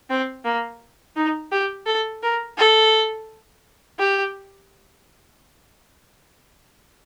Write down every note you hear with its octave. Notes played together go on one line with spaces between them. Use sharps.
C4
A#3
D#4
G4
A4
A#4
A4
G4